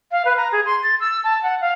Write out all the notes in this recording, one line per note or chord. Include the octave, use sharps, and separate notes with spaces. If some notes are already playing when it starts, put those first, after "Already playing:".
F5
B4
A#5
G#4
C6
A6
E6
A5
F#5
F5